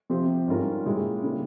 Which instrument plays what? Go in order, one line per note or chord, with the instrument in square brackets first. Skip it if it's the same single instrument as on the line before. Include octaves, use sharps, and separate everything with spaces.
[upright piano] C3 F3 C4 G4 C5
G#2 G3 C#4 F4 A#4
A#2 G#3 C#4 E4 G4
C#3 G3 A#3 E4